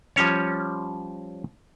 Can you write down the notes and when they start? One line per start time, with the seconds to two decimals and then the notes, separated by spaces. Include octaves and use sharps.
0.16 F3 G3 C#4 C#5